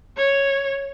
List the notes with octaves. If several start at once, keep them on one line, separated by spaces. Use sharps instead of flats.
C#5